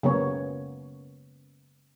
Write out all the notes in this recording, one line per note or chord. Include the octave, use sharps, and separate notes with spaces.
C#3 F#3 A#3 B3 C#5